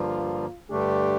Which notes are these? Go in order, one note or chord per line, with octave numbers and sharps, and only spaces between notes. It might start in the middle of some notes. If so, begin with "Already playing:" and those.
Already playing: G2 D3 F3 A#3 F4
G2 D3 A3 D4 G4